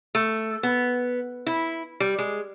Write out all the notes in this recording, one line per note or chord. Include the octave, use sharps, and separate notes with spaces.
A3
B3
E4
G3
G#3